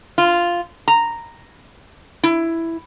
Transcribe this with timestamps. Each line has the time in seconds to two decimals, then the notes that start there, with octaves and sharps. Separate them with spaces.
0.18 F4
0.88 A#5
2.23 E4